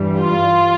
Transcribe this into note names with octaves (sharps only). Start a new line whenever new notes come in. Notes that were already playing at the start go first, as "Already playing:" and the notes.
Already playing: G2 E3 G3
F4